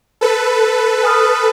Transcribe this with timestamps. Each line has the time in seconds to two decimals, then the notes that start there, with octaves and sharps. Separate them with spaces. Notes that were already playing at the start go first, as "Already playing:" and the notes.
0.21 A4 B4
1.03 G#5 D#6 F6